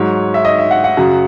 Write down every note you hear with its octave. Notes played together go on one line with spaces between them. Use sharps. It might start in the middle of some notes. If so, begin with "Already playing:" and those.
Already playing: G#2 F#3 C#5
E5
D#5
E5
F#5
F#5
F#2 C#3 F#3